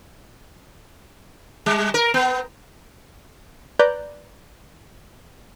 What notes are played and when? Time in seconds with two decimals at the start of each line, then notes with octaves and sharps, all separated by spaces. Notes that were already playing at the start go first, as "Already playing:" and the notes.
1.66 G3
1.94 A#4
2.14 B3
3.79 B4 D5 A#5 F#6 G6